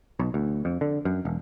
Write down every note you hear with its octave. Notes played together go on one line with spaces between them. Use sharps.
B1
D2
F2
D3
F#2
E1